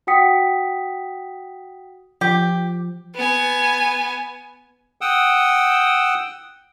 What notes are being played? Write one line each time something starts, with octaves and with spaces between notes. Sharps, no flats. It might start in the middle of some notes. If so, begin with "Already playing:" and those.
F#4 F#5 G5 D#6 B6 C#7
F3 G4
B3 G#5
F#5 G5 D#6 E6